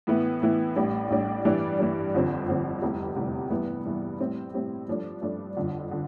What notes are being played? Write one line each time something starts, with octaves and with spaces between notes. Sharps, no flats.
A2 E3 B3 E4
A2 E3 B3 E4
A1 A2 G3 D4
A1 A2 G3 D4
G2 E3 G3 D4
G2 E3 G3 D4
G1 F2 D3 F3 C4
G1 F2 D3 F3 C4
F1 E2 C3 G3
F1 E2 C3 G3
G2 E3 B3
G2 E3 B3
A2 G3 C4 E4
A2 G3 C4 E4
G2 F3 A3 D4
G2 F3 A3 D4
G1 F2 D3
D3